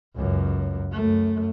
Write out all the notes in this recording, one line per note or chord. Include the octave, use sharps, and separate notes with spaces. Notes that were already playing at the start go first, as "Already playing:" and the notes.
C#2 F#2
F#2 A3